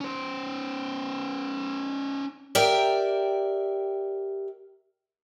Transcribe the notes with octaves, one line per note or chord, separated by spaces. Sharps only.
C#4 C5
G4 A#4 D5 E5 G5